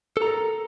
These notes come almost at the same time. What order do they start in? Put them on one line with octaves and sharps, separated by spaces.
A4 A#5 A#4